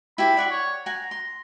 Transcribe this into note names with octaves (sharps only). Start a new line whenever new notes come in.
E4 G4 C5 B5
D5 F#5 C#6
C#5
F#5 G#5 A#5
C6